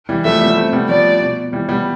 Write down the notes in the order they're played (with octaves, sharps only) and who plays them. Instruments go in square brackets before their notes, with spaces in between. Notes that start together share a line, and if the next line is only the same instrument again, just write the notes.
[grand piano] E3 G3
[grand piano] F3 A3 [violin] E5
[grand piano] G3 B3
A3 C4
G3 B3
[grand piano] F3 A3 [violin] D5
[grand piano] B2
E3 G3
G3 B3